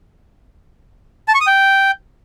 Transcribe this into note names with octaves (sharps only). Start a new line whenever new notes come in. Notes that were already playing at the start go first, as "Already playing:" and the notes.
A5
C#6
D#6
G5